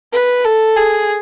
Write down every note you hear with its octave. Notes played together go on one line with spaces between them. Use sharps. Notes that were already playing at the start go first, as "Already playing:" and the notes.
B4
A4
G#4